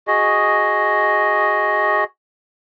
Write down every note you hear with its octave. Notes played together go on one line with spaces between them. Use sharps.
F#4 G#4 D#5